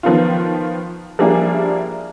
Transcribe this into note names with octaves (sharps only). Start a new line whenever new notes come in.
D#3 F3 B3 F4
F3 G3 A#3 D4 E4 G#4